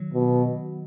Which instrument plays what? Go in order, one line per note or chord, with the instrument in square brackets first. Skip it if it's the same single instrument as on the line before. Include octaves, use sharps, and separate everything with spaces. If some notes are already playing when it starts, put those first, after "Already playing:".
Already playing: [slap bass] D#3 F#3
[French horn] B2